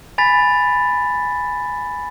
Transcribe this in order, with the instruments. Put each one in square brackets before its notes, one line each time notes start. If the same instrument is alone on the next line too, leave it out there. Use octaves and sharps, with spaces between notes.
[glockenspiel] G#5 B5 A6 B6